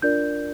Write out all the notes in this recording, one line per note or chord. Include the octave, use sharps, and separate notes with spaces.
D4 F4 A#4 D5 G6